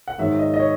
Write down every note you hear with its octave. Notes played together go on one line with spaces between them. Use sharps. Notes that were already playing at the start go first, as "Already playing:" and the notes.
F#5
G#2 D#3 F#3 E5
D#5
D#5
C#5